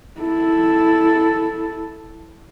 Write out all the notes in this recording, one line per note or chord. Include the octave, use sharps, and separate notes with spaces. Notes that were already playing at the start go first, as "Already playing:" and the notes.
E4 A4